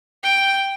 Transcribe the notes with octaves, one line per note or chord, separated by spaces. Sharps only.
G5